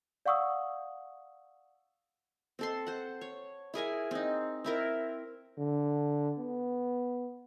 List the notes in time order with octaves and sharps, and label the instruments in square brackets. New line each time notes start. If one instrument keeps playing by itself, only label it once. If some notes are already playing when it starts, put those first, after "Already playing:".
[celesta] D5 F5 F#5 C#6 D#6 E6
[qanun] C4 A4 C6
C5 F#5
C#5
E4 G#4 A#4 G#5
C4 D#4
C4 E4 A#4
[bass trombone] D3
B3